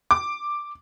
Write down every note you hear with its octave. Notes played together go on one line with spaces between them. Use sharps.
D6